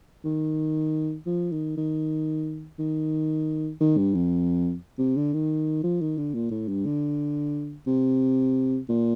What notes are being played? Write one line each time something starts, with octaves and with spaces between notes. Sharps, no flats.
D#3
F3
D#3
D#3
D#3
D#3
G2
F2
C3
D3
D#3
F3
D#3
D3
A#2
A2
G2
D3
C3
A#2